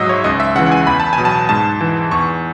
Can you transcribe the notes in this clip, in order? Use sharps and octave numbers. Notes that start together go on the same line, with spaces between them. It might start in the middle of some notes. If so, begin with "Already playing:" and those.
Already playing: G#2 F#3 D#5 E5
C#5
C#2 D#5
E5
C#3 E3 F#5
F#5
G#5
E2 B5
A5
G#5
B2 F#3
A5
G#2 A5
E3
E2 C#6